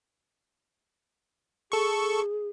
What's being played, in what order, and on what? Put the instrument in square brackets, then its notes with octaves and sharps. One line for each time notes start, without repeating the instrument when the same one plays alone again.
[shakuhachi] G#4 [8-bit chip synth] A4 C#6